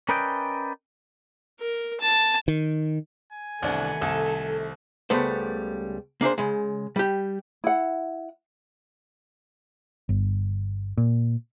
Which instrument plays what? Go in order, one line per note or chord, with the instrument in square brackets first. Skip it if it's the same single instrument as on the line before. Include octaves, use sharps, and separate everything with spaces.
[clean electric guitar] C#4 A#4 B4 D5 D#5 G5
[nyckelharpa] A#4
A5
[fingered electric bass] D#3
[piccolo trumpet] G#5
[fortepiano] C2 D4 [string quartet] D#3 A3 [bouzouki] E3 B3
[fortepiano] C2 [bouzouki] A4
[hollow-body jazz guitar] C#2 G3 A3 B3 C5
A#3 D4 G#4 C5
C#3 G#3
G3 G4
[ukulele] E4 F#5
[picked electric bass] G1
A#2